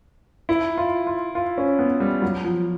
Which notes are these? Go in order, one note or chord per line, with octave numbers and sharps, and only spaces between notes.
E4
F4
F4
F4
C#4
B3
G3
F#3
F3